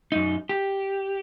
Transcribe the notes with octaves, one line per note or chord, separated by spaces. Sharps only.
F#2 D#4
G4